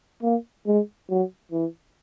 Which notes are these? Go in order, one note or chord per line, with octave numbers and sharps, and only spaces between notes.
A#3
G#3
F#3
E3